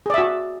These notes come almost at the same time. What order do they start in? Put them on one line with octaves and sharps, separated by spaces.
G#4 D5 E5 F#4